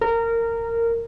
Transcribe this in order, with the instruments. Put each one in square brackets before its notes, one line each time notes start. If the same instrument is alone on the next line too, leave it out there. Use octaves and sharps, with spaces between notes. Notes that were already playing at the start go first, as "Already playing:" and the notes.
[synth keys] A#4